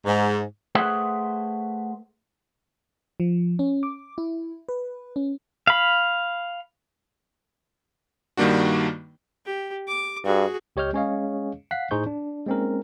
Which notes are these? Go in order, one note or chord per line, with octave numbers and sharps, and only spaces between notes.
G#2
A3 G#4 B4 C5 E5 F#5
F3
C#4
D6
E4
B4
C#4
F5 B5
G2 D#3 G3 A#3 D4 F#4
G4
D6
G2 F#4 G#4
C#2 G4 C#5 D#5 F6 G6
G#3 C#4 G#4 C#5 D#5 F5
F5 F#5 F#6 B6 C7
A2 D#4 G#4 C5 C#6 G6
D4
G#3 A#3 C4 C#4 D#4 A#4